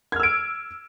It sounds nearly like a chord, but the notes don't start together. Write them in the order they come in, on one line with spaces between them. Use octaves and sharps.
G#6 F6 E6 D7